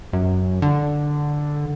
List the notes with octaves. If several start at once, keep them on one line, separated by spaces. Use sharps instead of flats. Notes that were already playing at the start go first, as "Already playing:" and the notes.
F#2
D3